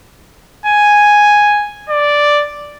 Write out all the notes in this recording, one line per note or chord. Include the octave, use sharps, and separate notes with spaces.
G#5
D5